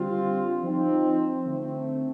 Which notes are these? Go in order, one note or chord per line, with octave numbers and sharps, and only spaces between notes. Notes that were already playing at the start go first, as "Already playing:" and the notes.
Already playing: D3 G3 C4 F4
F3 C4 D#4
D3 A3 C4